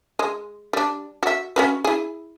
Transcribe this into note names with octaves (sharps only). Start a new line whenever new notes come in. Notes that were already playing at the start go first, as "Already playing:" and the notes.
G#3
G3 D4
F#4 E5
C#4 F#4 B4
E4 G#4